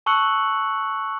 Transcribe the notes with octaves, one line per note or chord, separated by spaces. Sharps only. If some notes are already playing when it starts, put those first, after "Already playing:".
A5 C#6 E6 F#6 C#7 F#7